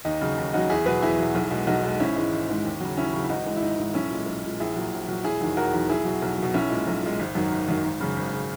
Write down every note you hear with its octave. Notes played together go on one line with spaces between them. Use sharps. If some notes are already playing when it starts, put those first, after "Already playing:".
D#2 D#4
C#3 F#3
D#2
C#3 F#3 D#4 F#4
E2 E4 G#4
B2 F#3 G#4 B4
E2 E4 G#4
B2 F#3
B1
B2 G#3
B1 D#4 F#4
B2 G#3
G#1 C#4 E4
G#2 E3 G#3
G#1
G#2 E3 G#3
D#2
C#3 F#3
D#2 C#4 E4
C#3 F#3
E4
G#1 D#4 F#4
G#2 E3 G#3
E4
G#1 D#4
G#2 E3 G#3
B1 C#4 E4
A#2 G#3
B1
A#2 G#3
A#1 E4 G#4
A#2 F#3
A#1
A#2 F#3
E1 E4 G#4
E2 D#3 F#3
E1 F#4 A#4
E2 D#3 F#3
B1 E4 G#4
B2 F#3
B1
B2 F#3
B1 C#4 E4
A#2 G#3
B1
A#2 G#3
G#1
F#2 D#3 F#3
G#1
F#2 D#3 F#3
G#1
F#2 C#3
G#1
C#3